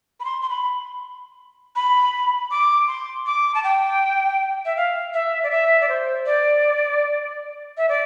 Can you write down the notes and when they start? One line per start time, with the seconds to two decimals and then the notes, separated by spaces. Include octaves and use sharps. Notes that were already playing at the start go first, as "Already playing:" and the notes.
0.20 B5
0.25 C6
0.42 C6
0.50 B5
1.76 B5
2.51 D6
2.87 C6
3.26 D6
3.55 A5
3.64 G5
4.65 E5
4.77 F5
5.14 E5
5.43 D5
5.51 E5
5.81 D5
5.89 C5
6.26 D5
7.77 E5
7.89 D5